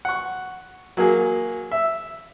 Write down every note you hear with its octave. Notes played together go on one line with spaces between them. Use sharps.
F#5 C#6
F#3 A#3 G#4
E5